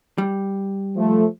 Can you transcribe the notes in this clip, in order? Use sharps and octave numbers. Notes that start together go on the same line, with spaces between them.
G3
F3 A3